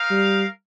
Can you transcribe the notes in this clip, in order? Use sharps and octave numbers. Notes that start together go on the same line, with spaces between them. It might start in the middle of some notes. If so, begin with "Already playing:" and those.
Already playing: D#4 A#4 F5
G3